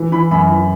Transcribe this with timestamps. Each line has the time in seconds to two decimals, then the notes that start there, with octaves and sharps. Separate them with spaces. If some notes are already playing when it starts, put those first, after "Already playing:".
Already playing: E3
0.12 E3 B5
0.31 F#2 B5
0.50 E3